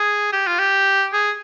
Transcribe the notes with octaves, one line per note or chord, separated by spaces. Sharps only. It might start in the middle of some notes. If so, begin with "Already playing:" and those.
Already playing: G#4
G4
F4
G4
G#4